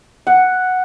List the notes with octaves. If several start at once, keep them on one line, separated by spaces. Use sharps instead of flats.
F#5